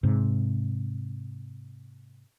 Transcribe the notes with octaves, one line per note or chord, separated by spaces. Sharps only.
G#2 C3